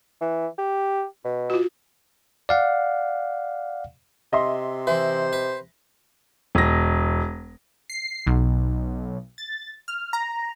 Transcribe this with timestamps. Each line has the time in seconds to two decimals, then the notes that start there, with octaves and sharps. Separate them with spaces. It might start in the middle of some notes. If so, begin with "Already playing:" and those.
0.21 E3
0.58 G4
1.24 B2
1.50 F4 F#4
2.49 D5 F5 F#5
4.33 C3 D#5 E5 C6
4.87 E3 C5
5.33 B4
6.55 E1 A#6
7.90 C7
8.27 B1
9.38 A6
9.88 F6
10.13 A#5